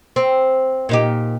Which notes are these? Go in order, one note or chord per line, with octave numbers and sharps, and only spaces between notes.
C4
A#2 D#4 G4